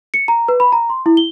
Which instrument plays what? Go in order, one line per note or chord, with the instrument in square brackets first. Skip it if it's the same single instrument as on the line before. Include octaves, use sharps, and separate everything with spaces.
[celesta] C#7
A#5
B4
B5
A#5
C6
E4
G7